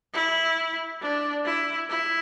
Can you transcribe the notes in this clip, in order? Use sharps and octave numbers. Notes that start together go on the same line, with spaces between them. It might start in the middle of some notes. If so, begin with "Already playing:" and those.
E4
D4
E4
E4